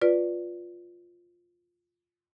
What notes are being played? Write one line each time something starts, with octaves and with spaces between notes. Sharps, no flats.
F4 B4 D5